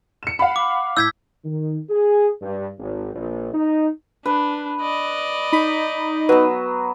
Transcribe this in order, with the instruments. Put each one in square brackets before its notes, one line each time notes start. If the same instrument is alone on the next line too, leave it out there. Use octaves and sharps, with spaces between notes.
[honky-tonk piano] C#7 E7
F5 F#5 B5
[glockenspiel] D6
[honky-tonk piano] A2 G6 [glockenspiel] E6 G#6 B6
[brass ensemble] D#3
G#4
G2
G#1
A#1
D#4
[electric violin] D4 [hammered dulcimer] B4
[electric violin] D5 D#5
[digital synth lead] D#4 [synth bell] B5 B6
[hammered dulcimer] F#3 B3 [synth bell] B4